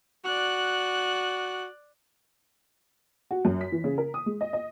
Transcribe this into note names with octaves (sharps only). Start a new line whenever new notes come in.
F#4 D5 F#6
F#4
F#2
B6
E3
C#3
A#4
D#6
G#3
D#5
D#5